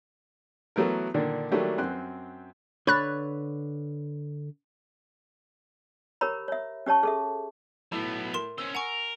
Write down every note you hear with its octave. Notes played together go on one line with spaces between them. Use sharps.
E3 F#3 A3 B3 A#4
A#2 D3 D#3 D4
D#3 F#3 G3 A3 A#3 D4
F#2 C4 C6 F#6
D3 B4 C#5 B5 F#6 A6
G4 A#4 C#5 A#5 B5
C#5 E5
C#4 G4 C#5 A5 C#6
G#4 A4 E5
A2 F#3 B3
A#4 C6 E7
C#4 C5 E6
A#4 F#5 G#5 C#6